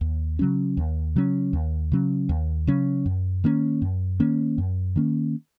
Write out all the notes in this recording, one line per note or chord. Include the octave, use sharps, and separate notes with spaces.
D#2
C#3 F#3 C#4
D#2
C#3 F#3 C#4
D#2
C#3 F#3 C#4
D#2
C#3 F#3 C#4
F#2
D#3 A#3 C#4
F#2
D#3 A#3 C#4
F#2
D#3 A#3 C#4